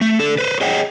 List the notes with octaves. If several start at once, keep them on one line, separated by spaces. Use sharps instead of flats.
A3
D3 A4
B4 C5
G#4 C#5 D#5 F#5 G5